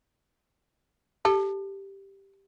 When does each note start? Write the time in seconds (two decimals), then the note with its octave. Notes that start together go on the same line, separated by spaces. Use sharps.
1.25 G4 A4